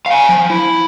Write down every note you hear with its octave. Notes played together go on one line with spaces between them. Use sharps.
F5 G#5
F3
E4